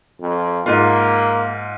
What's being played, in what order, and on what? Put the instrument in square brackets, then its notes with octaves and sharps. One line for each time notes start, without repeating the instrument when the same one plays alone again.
[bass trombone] F2
[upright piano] G#2 F4 [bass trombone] A#3